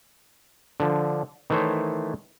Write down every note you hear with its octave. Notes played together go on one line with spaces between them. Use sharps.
D3 F3
D#3 E3 A3 E4 C5 C#5